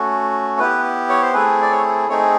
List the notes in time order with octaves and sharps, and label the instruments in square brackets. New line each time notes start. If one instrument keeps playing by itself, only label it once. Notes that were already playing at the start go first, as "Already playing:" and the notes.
Already playing: [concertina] A3 C#4 F#4
B3 E4 G4 B4
C#5
C5
A3 C4 E4 G#4 B4
D5
C#5
A3 C4 D#4 G#4 C#5